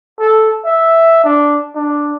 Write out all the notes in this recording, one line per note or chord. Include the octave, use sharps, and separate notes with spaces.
A4
E5
D4
D4